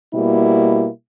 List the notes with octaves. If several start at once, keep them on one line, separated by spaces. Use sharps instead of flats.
B2 G3 A#3 E4